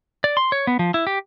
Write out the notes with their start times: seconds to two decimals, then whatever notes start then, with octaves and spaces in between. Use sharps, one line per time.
0.24 D5
0.37 C6
0.52 C#5
0.67 B3
0.79 F3
0.94 E4
1.07 G4